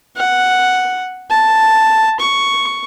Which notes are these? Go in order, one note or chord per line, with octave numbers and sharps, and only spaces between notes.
F#5
A5
C#6